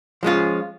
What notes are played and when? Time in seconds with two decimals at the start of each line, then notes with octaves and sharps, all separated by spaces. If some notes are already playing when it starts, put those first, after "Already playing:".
0.23 F3 G#3 C#4 F4